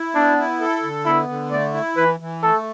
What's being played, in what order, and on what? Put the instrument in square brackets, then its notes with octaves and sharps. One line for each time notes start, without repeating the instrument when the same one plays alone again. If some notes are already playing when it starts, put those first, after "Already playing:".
Already playing: [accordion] E4
[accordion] B3 [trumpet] D4
[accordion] E4
A4
D3
[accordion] B3 [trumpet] E4
[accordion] D3
[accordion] A3 [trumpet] D5
[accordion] E4
[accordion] E3 [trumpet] B4
[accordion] E3
[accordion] A3 [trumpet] A4